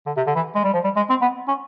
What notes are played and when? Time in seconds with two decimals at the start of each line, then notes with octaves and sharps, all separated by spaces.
0.07 D3
0.17 C3
0.27 D3
0.36 E3
0.55 G#3
0.64 G3
0.74 F3
0.84 G3
0.97 G#3
1.10 C4
1.22 B3
1.48 C#4